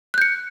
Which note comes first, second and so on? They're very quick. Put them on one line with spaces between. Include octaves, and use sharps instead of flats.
F#6 G6 C#7